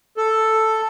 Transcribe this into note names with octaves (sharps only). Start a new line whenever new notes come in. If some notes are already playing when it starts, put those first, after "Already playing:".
A4